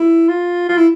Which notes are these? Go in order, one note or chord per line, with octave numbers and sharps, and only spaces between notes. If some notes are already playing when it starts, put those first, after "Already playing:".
Already playing: E4
F4
F4
E4